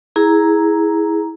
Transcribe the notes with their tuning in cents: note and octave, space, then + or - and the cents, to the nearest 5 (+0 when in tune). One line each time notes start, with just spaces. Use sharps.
E4 -15 G#4 +0 A#5 +0